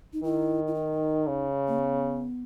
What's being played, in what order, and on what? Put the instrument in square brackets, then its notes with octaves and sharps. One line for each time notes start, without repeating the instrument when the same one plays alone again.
[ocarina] D#4
[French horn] D#3 [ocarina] E4
[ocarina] E4
D#4
[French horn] C#3
[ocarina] A#3
B3